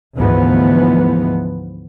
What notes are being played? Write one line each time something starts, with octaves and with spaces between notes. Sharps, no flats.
D2 G#2 E3 F3 B3